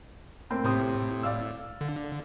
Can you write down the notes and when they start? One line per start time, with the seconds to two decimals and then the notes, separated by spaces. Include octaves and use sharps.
0.50 A2 A#3 C4
0.64 A2 C3 C4 D#6
1.23 D5 F5 E6
1.81 D3